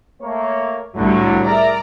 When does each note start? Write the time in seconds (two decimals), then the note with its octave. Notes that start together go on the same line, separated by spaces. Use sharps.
0.21 A3 A#3 C#5
0.95 C2 A2 D3 F#3 G3
1.44 G#4 A#4 D5 E5 A#5 D6